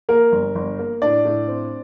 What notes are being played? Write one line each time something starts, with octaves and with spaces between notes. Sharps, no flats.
A#3 A#4
G1
G1
A#3
A2 D4 D5
A2
C4